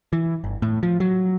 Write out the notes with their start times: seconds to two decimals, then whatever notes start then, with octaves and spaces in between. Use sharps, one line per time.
0.13 E3
0.44 G1
0.62 A2
0.83 F3
1.00 F#3